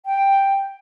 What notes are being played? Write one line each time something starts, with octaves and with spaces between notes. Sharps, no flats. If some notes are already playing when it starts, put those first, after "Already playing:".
G5